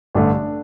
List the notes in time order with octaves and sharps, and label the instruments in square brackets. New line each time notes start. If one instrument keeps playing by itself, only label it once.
[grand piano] A1 G2 D3 A3 D4